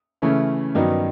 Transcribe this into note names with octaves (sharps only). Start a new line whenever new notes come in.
C#3 E3 A3 C#4 E4
G2 D#3 F#3 B3 D#4